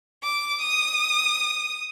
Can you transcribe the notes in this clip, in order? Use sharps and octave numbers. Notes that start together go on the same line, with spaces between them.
D6
D#6